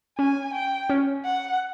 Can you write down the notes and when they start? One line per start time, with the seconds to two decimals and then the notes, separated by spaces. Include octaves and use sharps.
0.18 C#4 G#5
0.53 G5
0.90 C#4
1.24 F#5